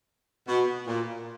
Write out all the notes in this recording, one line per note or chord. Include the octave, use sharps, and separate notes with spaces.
B2
A#2